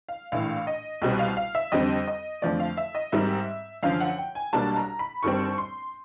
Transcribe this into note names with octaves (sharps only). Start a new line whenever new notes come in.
F5
A#1 A2 E3 F5
D#5
C2 B2 G3 C4 D#5
F5
F5
E5
F2 D3 G3 C4 D#5
D#5
F2 D3 F3 A3 D5
F5
E5
D#5
G#2 D#3 G3 C4 D#4 E5
F#2 D3 F3 F5
F#5
G5
G#5
B1 B2 G3 A#3 D4 A5
A#5
B5
G1 G2 D#3 G3 C4 C#6
C6